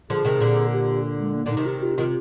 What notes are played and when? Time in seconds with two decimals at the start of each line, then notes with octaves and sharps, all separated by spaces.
0.10 D3 F3 G#4
0.25 C3 D#3
0.40 A#2 D3
0.72 G4
1.20 G#3
1.35 A#3
1.46 A#2 D3 D#4
1.57 C3 D#3
1.66 G4
1.83 F4
1.98 C3 D#3 F4